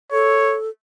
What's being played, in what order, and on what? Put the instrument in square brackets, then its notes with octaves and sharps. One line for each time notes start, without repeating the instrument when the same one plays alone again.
[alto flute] A4 [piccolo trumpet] C#5